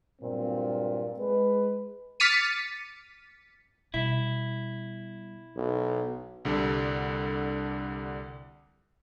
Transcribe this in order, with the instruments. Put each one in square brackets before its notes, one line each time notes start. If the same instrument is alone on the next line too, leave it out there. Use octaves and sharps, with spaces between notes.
[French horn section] G2 A#2 F#3 A#3 C4
G#3 B4
[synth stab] D6 F6 A6 B6 C#7 D#7
[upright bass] B2 G3 [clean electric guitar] E4
[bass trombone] B1
[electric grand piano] C2 D3 G3 A4